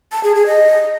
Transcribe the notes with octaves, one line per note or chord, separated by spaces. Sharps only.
A5
G#4
G#4
D#5